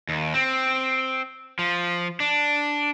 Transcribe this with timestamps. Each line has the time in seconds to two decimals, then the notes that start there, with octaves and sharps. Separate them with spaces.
0.09 D#2
0.34 C4
1.59 F3
2.20 D4